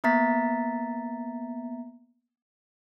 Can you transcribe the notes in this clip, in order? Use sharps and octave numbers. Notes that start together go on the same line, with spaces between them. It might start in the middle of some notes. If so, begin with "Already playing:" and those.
A#3 B3 E5 A#5 A6 B6